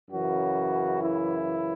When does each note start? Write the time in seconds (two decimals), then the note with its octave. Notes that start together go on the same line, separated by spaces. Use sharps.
0.11 F#2 C#3 E3 F#4
1.00 E4